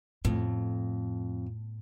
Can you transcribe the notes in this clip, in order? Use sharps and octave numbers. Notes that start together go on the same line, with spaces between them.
F2 A2